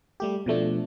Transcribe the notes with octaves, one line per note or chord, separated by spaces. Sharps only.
G3 A3 G4
B2 F3 A3 D4